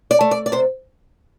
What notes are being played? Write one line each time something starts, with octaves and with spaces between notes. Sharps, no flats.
D5
A3
D5
D5
C3 C5